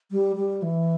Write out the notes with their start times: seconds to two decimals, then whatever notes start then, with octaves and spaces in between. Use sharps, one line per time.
0.11 G3
0.36 G3
0.62 E3